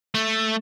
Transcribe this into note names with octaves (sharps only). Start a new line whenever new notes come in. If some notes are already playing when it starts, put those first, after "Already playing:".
A3